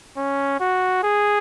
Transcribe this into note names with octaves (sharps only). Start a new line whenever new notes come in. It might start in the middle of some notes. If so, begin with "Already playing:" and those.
C#4
F#4
G#4